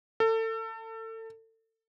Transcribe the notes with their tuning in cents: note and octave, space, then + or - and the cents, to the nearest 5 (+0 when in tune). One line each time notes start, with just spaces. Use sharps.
A4 +30